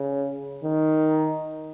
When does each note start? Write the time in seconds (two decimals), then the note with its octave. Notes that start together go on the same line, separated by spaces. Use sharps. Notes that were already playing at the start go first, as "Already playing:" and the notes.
Already playing: C#3
0.64 D#3